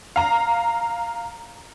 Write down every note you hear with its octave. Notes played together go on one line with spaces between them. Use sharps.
F5 A#5